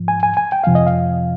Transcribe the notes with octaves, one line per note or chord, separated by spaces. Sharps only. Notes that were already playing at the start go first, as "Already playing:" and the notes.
Already playing: G#2 F3
G#5
G#5
G#5
G5
F2 C3 F3 F5
D#5
F5